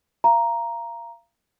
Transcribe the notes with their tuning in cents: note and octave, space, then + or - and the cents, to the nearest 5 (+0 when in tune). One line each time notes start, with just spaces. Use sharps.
F5 -35 A#5 +5